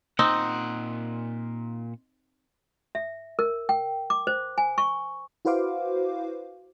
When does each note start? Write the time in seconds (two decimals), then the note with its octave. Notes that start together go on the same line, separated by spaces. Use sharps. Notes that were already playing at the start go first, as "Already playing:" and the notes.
0.19 A#2 C4 D#4 F#5
2.95 E5
3.39 A#4
3.69 G5
4.10 D6
4.27 C5
4.58 G#5
4.78 C#6
5.45 E4 F#4 B4 C5 F5 D6